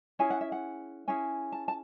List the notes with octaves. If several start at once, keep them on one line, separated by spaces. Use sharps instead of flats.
C#4 E4 G#4 G#5
F#5
E5
F#5
C#4 E4 G#4 G#5
A5
A5